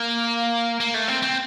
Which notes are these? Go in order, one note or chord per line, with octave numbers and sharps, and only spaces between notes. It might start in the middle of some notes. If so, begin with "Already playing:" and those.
Already playing: A#3
A#3
A3
C4
C4